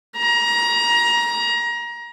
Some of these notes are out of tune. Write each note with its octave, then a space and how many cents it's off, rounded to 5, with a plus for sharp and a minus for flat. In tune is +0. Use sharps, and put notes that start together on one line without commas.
A#5 +25